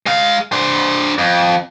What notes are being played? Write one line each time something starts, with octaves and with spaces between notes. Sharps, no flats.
G#3 F5
D4 C5
F2